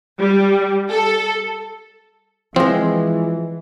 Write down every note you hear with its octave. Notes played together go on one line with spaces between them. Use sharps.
G3
A4
E3 F3 G#3 C4